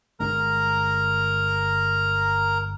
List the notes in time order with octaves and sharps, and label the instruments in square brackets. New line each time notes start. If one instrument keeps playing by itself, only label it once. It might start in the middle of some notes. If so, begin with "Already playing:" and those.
[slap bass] G1 G#3 D4 [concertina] A#4 A#5